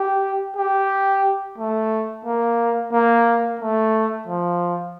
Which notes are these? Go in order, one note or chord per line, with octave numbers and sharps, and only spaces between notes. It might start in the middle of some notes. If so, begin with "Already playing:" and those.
Already playing: G4
G4
A3
A#3
A#3
A3
F3